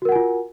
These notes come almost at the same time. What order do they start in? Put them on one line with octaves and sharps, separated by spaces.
F#4 A#4 F#5 G#5 F4